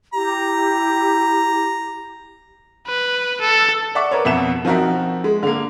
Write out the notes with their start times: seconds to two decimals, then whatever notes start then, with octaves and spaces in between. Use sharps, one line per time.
0.13 E4 G4 A#5
2.87 B4
3.41 A4
3.95 D5 E5 F#5 C#6 D6
4.11 A#4 B4 C#5
4.25 F2 B2 E5 F#5 E7
4.65 F3 C4 D#4 F#4 A#4 E5
5.24 G#3
5.43 D3 A#3